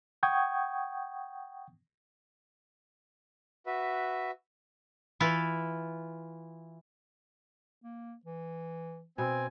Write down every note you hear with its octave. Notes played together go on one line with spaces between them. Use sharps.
F#5 G5 C#6 D#6 G6 G#6
F#4 B4 E5
E3 E4 F4
A#3
E3
B2 C4 G#5